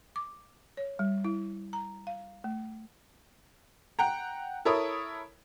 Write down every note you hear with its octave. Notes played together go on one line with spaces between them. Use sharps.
D6
C#5
G3
E4
A#5
F5
A3
F#5 G5 A#5
E4 A4 A#4 C#5 B5 D#6